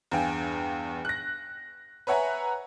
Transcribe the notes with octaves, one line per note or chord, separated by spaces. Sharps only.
E2 G2 F5 G5 G#5
F#6 A#6
B4 C#5 E5 F#5 G#5 A#5